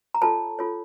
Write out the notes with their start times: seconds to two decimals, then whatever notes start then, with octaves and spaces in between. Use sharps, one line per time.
0.14 A#5
0.22 F4 A4 C#5 A5
0.59 F4 A4 C#5